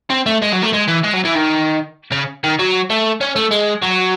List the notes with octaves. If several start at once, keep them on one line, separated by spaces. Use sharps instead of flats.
C4
A3
G#3
F#3
A3
G#3
E3
G#3
F#3
E3
D#3
C#3
D#3
F#3
A3
C#4
A3
G#3
F#3